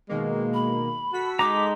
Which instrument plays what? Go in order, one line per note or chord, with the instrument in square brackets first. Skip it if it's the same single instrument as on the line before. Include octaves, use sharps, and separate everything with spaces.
[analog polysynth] B2 D#3 A#3 [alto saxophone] G#3
[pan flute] B5
[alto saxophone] F#4 [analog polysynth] A4 B6
[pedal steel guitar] G#3 D#4 A#5 [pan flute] D6